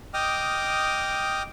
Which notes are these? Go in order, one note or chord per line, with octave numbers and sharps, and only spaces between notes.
D#5 G5 D6 D#6 F6